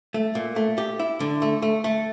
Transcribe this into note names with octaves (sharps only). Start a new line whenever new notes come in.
A3
A#2
A3
G4
E4
D3
A3
A3
A3